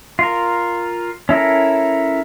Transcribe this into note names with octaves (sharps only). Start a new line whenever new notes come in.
F4 A#4
C#4 E4 A4 A#4